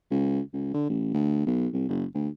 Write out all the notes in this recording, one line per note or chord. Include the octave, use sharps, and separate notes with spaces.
C#2
C#2
D3
A1
D2
B1
C2
F#1
D2